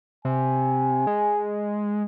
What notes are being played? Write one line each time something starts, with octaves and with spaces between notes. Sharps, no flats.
C3 G#5
G#3